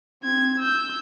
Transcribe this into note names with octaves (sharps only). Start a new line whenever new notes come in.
C4 G#6
E6 G6